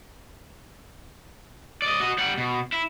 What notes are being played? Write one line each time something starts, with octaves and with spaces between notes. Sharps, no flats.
D5 D#5
F#4 D#5
G3 F#5
B2
E4